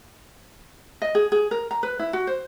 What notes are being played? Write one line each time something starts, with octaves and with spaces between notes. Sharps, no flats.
D#5
G#4
G#4
A#4
A#5
B4
E4
F#4
C5